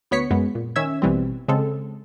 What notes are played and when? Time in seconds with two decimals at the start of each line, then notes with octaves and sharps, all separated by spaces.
0.11 D2 B3 C#5 B6 C#7
0.31 F#2 G#3 B3
0.55 A#2
0.76 D#3 C#4 E5 E6 G#6
1.02 A1 B2 E3 G3 C4
1.48 C#3 G#3 C4 A4